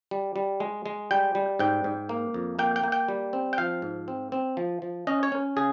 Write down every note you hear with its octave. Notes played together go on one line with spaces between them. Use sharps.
G3
G3
G#3
G#3
G3 G5
G3
G#2 G5
G#2
A#3
F2
A#3 G5
G5
A#3
G5
G3
C4
G5
F3 F5
G#2
C4
C4
F3
F3
C#4 D#5
C#5
C#4
C#3 G#4